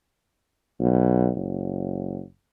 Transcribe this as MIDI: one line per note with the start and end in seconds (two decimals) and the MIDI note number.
0.80 1.30 35
1.37 2.21 30